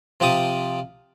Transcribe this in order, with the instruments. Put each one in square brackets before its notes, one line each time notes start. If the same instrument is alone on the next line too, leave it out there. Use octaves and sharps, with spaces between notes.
[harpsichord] C3 F3 G4 A5 D#6